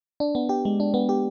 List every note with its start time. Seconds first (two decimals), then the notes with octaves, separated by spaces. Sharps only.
0.20 D4
0.35 B3
0.49 G4
0.65 G#3
0.80 D4
0.94 B3
1.09 G4